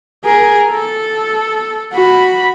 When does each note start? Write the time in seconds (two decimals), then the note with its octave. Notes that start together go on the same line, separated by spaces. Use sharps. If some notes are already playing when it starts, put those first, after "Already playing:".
0.25 G#4 A#4
0.71 A4
1.93 F#4 B5